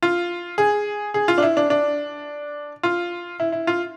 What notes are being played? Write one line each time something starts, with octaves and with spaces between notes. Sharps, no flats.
F4
G#4
G#4
F4
D4
E4
D4
D4
F4
E4
E4
F4